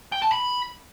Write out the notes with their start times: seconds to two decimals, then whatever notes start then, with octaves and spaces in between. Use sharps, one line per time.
0.12 G5
0.22 A5
0.32 B5